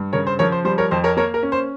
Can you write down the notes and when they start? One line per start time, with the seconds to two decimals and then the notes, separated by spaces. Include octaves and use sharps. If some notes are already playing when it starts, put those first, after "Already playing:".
Already playing: G2
0.13 C#3 A#4 C#5
0.27 C5
0.39 F3 A#4 C#5
0.52 C5
0.65 G3 C5
0.78 A#4 C#5
0.91 F2 C5
1.04 A#4 C#5
1.17 A#3 A#4 C#5
1.34 A#4
1.43 C#4
1.52 C5